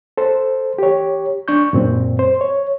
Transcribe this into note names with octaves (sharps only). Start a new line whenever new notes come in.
A4 C5
G4 C#5
D4 C#6 G6
F#2 A#2 C4
C5
C#5